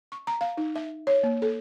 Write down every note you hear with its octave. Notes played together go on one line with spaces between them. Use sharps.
C#6
A#5
F5
D#4
E5
C#5
A#3
A4